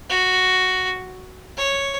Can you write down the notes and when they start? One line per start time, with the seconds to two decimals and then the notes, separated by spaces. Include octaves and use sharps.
0.10 F#4
1.57 C#5